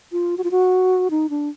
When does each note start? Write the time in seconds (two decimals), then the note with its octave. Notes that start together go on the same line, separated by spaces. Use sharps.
0.12 F4
0.38 F#4
0.44 F4
0.51 F#4
1.11 D#4
1.30 D4